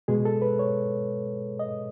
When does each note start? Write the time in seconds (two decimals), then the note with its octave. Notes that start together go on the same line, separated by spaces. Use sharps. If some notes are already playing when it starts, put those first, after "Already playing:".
0.08 B2 G#3 G#4
0.25 A4
0.42 B4
0.59 C#5
1.59 D#5